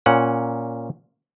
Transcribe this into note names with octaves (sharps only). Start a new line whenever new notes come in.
A#2 C#4 F#5